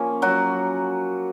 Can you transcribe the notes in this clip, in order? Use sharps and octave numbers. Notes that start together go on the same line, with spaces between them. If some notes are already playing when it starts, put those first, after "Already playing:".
Already playing: F3 A#3 C#4
F#3 F#4